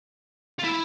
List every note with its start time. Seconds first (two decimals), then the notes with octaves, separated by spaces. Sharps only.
0.59 F4
0.64 E4